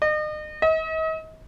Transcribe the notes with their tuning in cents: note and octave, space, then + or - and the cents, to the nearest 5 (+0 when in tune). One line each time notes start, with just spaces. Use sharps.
D#5 -35
D#5 +45